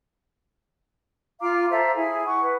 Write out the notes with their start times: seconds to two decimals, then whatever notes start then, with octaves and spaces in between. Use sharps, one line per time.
1.41 F4 F5 A#5 D6
1.70 A4 C5 E5 A#5
1.97 E4 G#4 G#5
2.25 F#5 C#6
2.42 B4